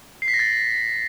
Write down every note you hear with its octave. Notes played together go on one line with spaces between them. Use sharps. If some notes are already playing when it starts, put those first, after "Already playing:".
C7
B6
A#6
A6